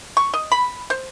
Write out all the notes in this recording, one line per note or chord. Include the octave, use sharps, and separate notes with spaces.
C#6
D#5
B5
C5